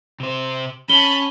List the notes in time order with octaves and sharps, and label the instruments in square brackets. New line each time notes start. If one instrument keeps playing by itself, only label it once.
[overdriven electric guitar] C3 C5
[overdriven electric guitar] C#4 [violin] A5 B5 [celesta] G7